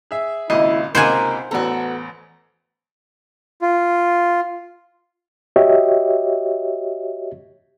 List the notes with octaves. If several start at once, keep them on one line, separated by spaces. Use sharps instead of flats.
G#4 E5
G#1 A#2 C#3 E4 D#5
C#2 C3 A#3 D#4 A#4 C5 F#5 G#5
A1 E2 B3 F#4 A4 A#5
F4
F#4 G4 C#5 D#5 E5